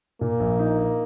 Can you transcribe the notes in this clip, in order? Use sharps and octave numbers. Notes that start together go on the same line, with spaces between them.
A#2 A#3
A#1
D#4
D#4